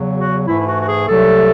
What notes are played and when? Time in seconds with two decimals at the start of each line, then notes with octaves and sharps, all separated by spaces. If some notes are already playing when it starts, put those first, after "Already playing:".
Already playing: E2 C#3 F#3
0.17 F#4
0.47 G#2 E3 A3 E4
0.60 E4
0.68 F#4
0.81 F#4
0.89 G#4
1.08 C2 C3 F#3 A3 A4